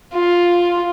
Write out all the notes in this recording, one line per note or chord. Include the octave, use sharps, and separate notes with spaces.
F4